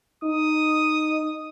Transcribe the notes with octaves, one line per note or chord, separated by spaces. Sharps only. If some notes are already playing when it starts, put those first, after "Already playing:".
D#4 D#6